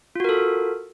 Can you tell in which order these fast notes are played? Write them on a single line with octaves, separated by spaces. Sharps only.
F4 F#4 A#4 A4